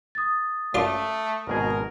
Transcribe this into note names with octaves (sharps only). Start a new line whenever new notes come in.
D#6 A6
F#2 A3 F4 D5
G#1 B2 G#4 A#4